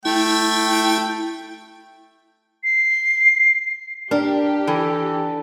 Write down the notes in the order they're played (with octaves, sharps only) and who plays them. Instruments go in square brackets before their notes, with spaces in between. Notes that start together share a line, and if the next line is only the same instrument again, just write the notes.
[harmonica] A3 G5 [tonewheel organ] E4
[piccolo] C7
[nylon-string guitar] D4 [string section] G4 [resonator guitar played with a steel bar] A#4
[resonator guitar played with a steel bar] E3 [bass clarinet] A4